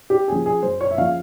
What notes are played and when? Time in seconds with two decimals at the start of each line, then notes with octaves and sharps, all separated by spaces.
0.10 G4
0.27 C#3 F3 G#4
0.46 G#4
0.62 F#2 C5
0.81 C#5
0.91 E5
0.97 C#3 F3 F5